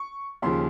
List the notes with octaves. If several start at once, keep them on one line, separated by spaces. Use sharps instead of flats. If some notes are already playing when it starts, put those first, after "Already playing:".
Already playing: C#6
D#2 C#3 F3 C6